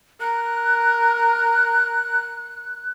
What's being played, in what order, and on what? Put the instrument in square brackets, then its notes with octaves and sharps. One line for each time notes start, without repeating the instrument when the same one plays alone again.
[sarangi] A#4 [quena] F#6